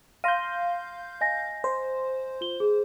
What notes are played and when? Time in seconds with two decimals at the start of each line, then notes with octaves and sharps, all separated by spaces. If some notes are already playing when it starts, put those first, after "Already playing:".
0.24 F5 C6 G6 A#6 D#7
1.21 D#5 G#5 A#6
1.64 C5
2.41 F4 G7
2.60 G#4